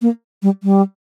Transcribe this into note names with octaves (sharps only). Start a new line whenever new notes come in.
A#3
G3
G3